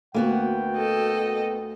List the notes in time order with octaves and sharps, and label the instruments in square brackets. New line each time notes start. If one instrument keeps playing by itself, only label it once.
[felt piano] D2 [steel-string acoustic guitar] A#3 B3 F#4 [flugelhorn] G5
[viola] A4 D#5